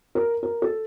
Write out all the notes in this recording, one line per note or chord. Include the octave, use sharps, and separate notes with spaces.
A#4
A#4
A4